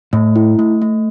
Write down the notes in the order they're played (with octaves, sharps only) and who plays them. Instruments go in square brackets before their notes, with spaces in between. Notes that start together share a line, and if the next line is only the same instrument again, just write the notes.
[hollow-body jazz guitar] A2 [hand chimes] A3
[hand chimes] E4
A3
A3